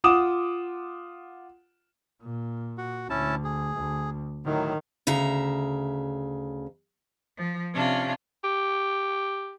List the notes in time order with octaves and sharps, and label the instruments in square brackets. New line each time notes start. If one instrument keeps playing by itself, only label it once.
[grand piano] F4 F#5 D6 D#6 E7
[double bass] A#2
[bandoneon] F#4
[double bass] D2 [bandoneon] C#4 E4 A5
[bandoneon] G#4
[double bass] D2
[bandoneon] A2 F#3 [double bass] D#3
[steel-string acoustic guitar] D2 C#3 E5 A#5
[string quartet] F3
C3 C#4 D4 F4
[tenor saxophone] G4